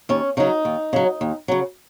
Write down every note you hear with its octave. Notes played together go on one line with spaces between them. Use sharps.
D#2 C#4
C#3 F#3 D#4
D#2
C#3 F#3
D#2
C#3 F#3